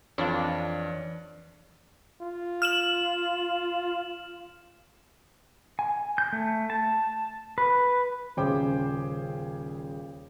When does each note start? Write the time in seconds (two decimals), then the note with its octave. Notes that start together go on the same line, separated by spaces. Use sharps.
0.18 F2 E3 D4 F4 C#5 A6
2.21 F4
2.62 F6 E7 F#7
5.79 G#5
6.18 G6
6.33 A3
6.70 A5
7.58 B4
8.37 D#1 C#3 G#4 C5 G5 D6